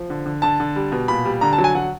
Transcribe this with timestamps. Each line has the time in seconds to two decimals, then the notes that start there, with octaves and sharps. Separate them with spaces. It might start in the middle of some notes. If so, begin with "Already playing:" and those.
Already playing: F3
0.10 D3
0.26 D3
0.42 D3 A5
0.60 D3
0.76 G3
0.92 B2
1.08 A#2 B5
1.25 G3
1.41 D3 A#5
1.53 A5
1.58 F#3
1.64 G#5
1.75 F#3 F#5